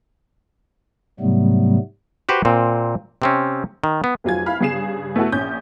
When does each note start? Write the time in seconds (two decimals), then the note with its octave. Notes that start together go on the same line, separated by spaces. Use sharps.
1.20 G#2 C3 F#3 G3 A3 B3
2.29 F#4 G4 B4 C5
2.45 A#2 C4
3.22 C3 C4 C#4
3.84 D#3
4.04 B3
4.24 F1 C3 F#3 F4 G#5 G#6
4.46 E4 F5 B5 F6
4.61 G2 C#3 G#4 C7 E7
5.16 A3 B3 E4 F#4 A4
5.32 A#1 C#4 G6